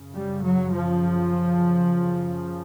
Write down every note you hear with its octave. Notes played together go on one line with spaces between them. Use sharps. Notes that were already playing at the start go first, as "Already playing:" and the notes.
Already playing: F#2 C#3
G3
F#3
F3